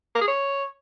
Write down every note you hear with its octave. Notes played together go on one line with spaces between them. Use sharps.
A#3
G#4
C#5